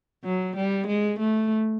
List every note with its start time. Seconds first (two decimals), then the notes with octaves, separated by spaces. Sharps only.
0.24 F#3
0.56 G3
0.87 G#3
1.19 A3